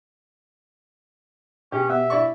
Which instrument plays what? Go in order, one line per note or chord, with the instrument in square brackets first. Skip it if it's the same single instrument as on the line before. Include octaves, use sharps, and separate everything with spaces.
[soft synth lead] B2 [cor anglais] C#4 [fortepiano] G4
[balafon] B3 [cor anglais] E5
[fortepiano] E4 D5 C#6